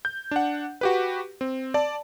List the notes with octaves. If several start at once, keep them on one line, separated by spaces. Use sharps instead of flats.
G6
D4 F#5
F#4 G4 B4
C4
D5 A5